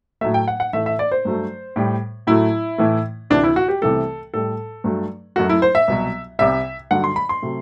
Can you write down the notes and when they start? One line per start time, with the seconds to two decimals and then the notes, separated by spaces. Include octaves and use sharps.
0.21 A2 F#3 A3 E5
0.34 G5
0.48 F#5
0.60 F#5
0.73 A2 E3 A3 E5
0.86 E5
0.99 D5
1.12 C5
1.25 G2 F#3 A3
1.76 A2 G3
2.27 A2 F#3 A3 E4
2.78 A2 E3 A3
3.30 D2 C3 E3 D4
3.44 E4
3.56 F#4
3.68 G4
3.82 C2 C3 E3 A3 A4
4.34 A2 G3 A4
4.84 G2 F#3 A3
5.36 F#2 F#3 A3 F#4
5.49 E4
5.62 C5
5.75 E5
5.88 C2 B2 F#3
6.39 C2 C3 G3 E5
6.91 G2 D3 F#3 F#5
7.04 C6
7.16 B5
7.29 C6
7.42 C3 F#3 A3